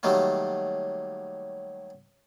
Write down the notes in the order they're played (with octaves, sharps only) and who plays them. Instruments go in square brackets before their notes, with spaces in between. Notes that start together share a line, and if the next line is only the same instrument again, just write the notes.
[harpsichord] D#3 F#3 G3 A3 A#3